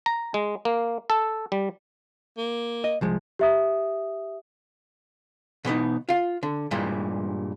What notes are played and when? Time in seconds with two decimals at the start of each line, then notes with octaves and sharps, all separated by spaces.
0.06 A#5
0.34 G#3
0.65 A#3
1.10 A4
1.52 G3
2.38 A#3
2.84 D#5
3.01 C2 F3 G#3
3.39 G4 E5 D#6
5.65 B2 E3 B3 D#4
6.09 F4 F5
6.43 D3
6.71 G2 A#2 E3 G3 G#3